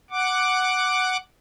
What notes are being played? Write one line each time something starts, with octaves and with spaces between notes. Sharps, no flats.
F#5 D6